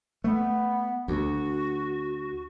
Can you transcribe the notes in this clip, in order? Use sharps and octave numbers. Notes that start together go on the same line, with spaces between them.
A3 B3
D2 F#4